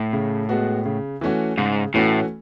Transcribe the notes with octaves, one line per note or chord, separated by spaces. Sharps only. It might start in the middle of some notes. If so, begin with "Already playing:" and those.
Already playing: A2
C#3
G#3 B3 F#4
C#3
E3 A3 C#4 F#4
G#2 C#3
A2 E3 A3 C#4 F#4